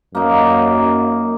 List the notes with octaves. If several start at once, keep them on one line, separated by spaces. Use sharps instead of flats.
F#2 A#3 D#4